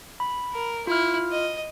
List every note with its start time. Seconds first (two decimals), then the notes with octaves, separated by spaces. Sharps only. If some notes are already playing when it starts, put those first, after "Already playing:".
0.20 B5
0.53 A#4
0.87 E4 F4 F6
1.31 D#5